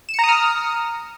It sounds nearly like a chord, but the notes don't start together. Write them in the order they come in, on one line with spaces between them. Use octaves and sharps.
E7 C#7 A#5 D#6 F6